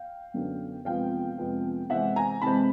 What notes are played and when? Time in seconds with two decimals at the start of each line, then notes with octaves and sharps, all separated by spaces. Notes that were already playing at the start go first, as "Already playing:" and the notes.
Already playing: F5 G5
0.34 F#2 D3 F#3 B3 D4
0.85 F2 C3 F3 G#3 B3 F5 G5
1.38 F2 C3 F3 G#3 B3
1.90 C3 E3 G#3 C4 E5 F#5
2.16 G#5 A#5
2.42 C3 E3 G#3 C4 A5 B5